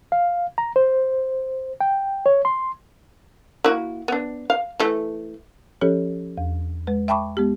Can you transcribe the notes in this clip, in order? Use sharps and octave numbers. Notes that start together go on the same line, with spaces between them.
F5
A#5
C5
G5
C#5
C6
A#3 E4 F#4
B3 D4
F5
E3 A3
F3 C#4 G4 A4 C#5
E2
G#3 B4
E5 G5 A5 B5 C#6 D6
G#3 B3 G4